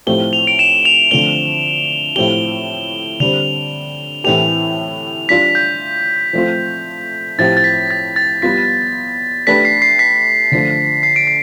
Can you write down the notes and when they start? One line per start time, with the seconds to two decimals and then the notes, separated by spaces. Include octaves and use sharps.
0.07 A2 F3 A3 C4 G4 G7
0.33 F7
0.47 D7
0.59 E7
0.85 F7
1.11 D3 F3 A3 C4 G7
2.16 A2 F3 A3 C4 G4 G7
3.20 D3 G3 C4 F7
4.24 A2 E3 A3 C4 G4 F7
5.29 G3 D4 F4 B6
5.55 G6
6.33 F3 A3 C4 F4
7.38 A2 F3 C4 G4 A6
7.57 A6
7.64 B6
7.91 A6
8.16 A6
8.42 G3 B3 F4 B6
9.47 A3 D4 G4 B4 B6
9.65 C7
9.82 C7
9.99 B6
10.52 D3 F3 A3
11.03 C7
11.16 D7
11.27 C7